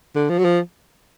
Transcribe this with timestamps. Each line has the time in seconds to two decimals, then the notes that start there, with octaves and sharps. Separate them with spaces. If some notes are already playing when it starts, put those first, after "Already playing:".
0.15 D3
0.29 F3
0.38 F#3
0.44 F3